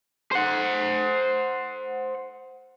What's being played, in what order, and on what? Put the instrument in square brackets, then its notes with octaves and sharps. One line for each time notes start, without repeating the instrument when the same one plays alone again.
[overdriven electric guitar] C5 F#5